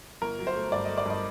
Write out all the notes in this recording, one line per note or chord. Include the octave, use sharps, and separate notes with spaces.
G1 A#4
F#3
C5
A3
G2 D5
D#5
A3
D5
G2 D#5